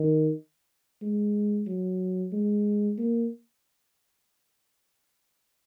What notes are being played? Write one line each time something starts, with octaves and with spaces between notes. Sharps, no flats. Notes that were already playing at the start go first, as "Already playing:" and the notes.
Already playing: D#3
G#3
F#3
G#3
A#3